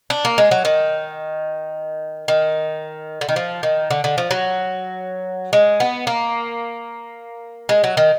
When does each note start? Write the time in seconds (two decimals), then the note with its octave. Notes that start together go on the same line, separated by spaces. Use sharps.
0.10 D4
0.25 A#3
0.38 G#3
0.51 F#3
0.65 D#3
2.28 D#3
3.21 D3
3.29 D#3
3.36 F3
3.63 D#3
3.91 D3
4.04 D3
4.18 F3
4.31 F#3
5.53 G#3
5.80 B3
6.07 A#3
7.69 G#3
7.84 F#3
7.97 D#3